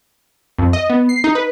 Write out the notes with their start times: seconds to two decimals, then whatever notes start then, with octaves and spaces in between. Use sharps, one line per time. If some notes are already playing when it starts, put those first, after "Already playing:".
0.58 F2
0.73 D#5
0.90 B3
1.09 C7
1.24 D#4
1.35 B4